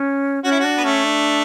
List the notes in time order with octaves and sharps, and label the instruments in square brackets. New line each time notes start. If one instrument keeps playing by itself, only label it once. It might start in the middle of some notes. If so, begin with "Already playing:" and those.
Already playing: [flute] C#4
[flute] C#4 [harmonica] F#4
[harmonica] E4
[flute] D4 [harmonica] F#4
[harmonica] B3
[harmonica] A3 [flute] C#4
[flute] D4